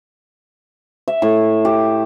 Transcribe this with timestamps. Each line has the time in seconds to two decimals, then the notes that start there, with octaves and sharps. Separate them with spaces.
1.08 E5
1.22 A2
1.65 G4